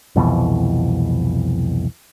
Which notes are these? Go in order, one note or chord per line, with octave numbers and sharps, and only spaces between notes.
C2 F2 B2 E3